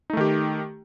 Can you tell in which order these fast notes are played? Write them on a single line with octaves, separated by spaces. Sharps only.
D#4 A3 D#3 G4